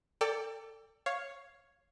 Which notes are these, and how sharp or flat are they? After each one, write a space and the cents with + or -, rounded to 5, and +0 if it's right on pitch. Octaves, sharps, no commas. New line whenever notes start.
A4 +25 D5 -10 G5 +30
C#5 +0 F5 +5